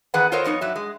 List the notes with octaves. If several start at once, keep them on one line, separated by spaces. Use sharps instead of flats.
E2 D#3 B3 G#4 B4 F#5
F4 A4 A#4 C5 C#5 D#5
F2 B3 D#4 C#5
G2 F#3 E5
G#3